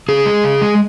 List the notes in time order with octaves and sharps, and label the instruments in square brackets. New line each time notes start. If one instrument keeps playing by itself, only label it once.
[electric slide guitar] C#3 G#4
G#3
C#3
G#3